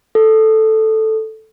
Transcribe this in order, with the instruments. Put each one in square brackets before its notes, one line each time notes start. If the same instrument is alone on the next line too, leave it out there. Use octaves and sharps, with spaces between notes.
[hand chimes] A4